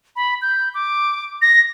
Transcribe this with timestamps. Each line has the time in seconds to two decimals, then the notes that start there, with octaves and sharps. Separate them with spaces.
0.16 B5
0.42 G6
0.74 D6
1.42 A#6